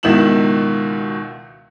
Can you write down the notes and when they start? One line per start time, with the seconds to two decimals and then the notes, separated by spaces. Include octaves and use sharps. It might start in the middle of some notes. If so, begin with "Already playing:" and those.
0.03 C#2 B2 D#3 E4 E7 F#7